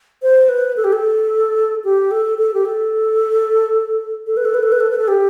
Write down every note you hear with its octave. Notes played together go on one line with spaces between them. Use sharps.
C5
B4
A4
G4
A4
G4
A4
A4
G4
A4
A4
B4
A4
B4
A4
B4
A4
B4
A4
G4